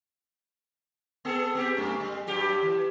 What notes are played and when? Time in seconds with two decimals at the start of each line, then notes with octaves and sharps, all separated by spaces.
1.25 B3 G#4 A4
1.55 B3 C4 G4
1.77 F#2 A3 C#4
2.00 G3
2.27 G2 F#3 G4
2.63 E3